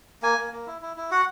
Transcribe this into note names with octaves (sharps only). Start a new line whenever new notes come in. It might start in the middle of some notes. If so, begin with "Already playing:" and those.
A#3 G#5
A#3
A#3
E4
E4
E4
F#4 F#5